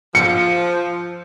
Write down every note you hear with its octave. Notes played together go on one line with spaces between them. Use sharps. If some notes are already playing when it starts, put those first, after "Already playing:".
F3 C#7